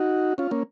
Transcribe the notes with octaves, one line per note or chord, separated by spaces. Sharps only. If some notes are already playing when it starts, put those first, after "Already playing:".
Already playing: D#4 F#4
C#4 F4
A#3 C#4